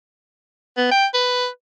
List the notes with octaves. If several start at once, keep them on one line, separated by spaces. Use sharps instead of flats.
B3
G5
B4